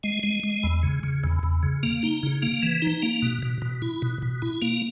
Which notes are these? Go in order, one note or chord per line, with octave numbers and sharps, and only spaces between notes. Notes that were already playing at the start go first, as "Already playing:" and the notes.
G#3
G#3
G#3
E2
C#3
C#3
E2
E2
C#3
A#3
D#4
C#3
A#3
E3
D#4
A#3
B2
B2
B2
E4
B2
B2
E4
A#3